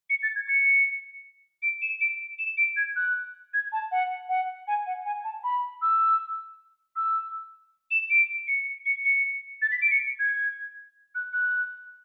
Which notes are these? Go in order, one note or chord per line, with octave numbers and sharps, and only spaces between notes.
C#7
A6
G#6
C#7
D7
E7
D7
E7
D7
G#6
F#6
G#6
A5
F#5
F#5
G#5
F#5
G#5
A5
B5
E6
E6
E7
D7
C#7
C#7
C#7
A6
B6
D7
C#7
G#6
F#6
F#6